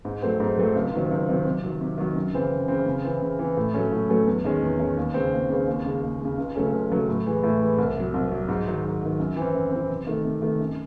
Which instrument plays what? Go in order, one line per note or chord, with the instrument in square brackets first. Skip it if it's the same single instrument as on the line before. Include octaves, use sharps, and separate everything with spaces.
[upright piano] G#2
F#3 A3 C4
G#2
F#3 A3 C4
C#2
C3 D#3 F#3 C4
C#2
C3 D#3 F#3 C4
C3
D#3 F#3
C3
D#3 F#3
F#2
C#3 E3 C4
F#2
C#3 E3 C4
C#3
E3 C4
C#3
E3 C4
A2
F#3 A3 C#4
A2
F#3 A3 C#4
E2
D#3 G#3 C#4
E2
D#3 G#3 C#4
D#2
C#3 G#3 C4
D#2
C#3 G#3 C4
D#2
C#3 G#3
D#2
C#3 G#3
C#2
C#3 F#3 A3 C#4
C#2
C#3 F#3 A3 C#4
A2
E3 G#3
A2
E3 G#3
C2
C3 F#3
C2
C3 F#3
G#2
D#3 F#3
G#2
D#3 F#3
F#2
E3 C4
F#2
E3 C4
C3
D#3 A3
C3
D#3 A3
F#2